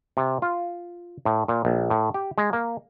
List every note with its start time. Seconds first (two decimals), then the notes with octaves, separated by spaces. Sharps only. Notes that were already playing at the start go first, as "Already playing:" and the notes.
0.17 C3
0.42 F4
1.25 A2
1.48 A#2
1.65 A#1
1.90 A2
2.14 G4
2.38 G#3
2.53 A#3